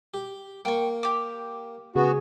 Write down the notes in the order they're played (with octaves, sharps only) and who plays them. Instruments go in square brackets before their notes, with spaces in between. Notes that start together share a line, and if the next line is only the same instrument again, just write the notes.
[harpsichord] G4
[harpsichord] A#3 [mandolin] G5 C#6
[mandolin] G4 D6
[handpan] C#3 G#4 [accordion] B3 F#4